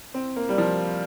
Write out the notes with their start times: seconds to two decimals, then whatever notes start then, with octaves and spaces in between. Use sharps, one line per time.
0.14 C4
0.36 A#3
0.49 G3
0.58 F3